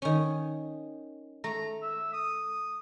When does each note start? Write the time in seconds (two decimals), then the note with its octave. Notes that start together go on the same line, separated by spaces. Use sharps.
0.02 D#3 C#4
1.44 A3 A#5
1.82 E5
2.13 D#6